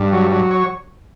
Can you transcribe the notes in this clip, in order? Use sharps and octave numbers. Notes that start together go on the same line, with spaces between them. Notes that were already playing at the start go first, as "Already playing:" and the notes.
Already playing: G2
F#3
F#3
C#5